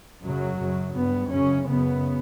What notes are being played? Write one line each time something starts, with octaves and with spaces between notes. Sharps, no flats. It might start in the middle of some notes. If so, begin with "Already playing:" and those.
F#2 C#3 F#3
F#2 C#3
G2 B3
F#2 C#3 C#4
F#2 C#3 B3